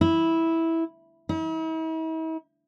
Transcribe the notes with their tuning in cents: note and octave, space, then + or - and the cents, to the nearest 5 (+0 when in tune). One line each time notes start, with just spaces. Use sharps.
E4 -10
E4 -45